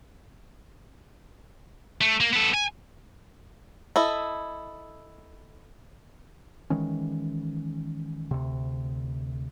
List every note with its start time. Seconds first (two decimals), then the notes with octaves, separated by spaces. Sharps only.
2.01 A3
2.20 A#3
2.33 B3 A4
2.54 G#5
3.96 E4 A4 D#5
6.70 D#3 E3 G#3 C#4
8.31 D2 C3